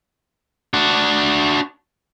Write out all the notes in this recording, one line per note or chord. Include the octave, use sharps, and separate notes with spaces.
D4 F#4